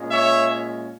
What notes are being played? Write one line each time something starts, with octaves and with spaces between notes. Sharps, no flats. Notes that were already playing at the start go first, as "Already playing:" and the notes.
Already playing: A#2 G#3 C#4
C#5 E5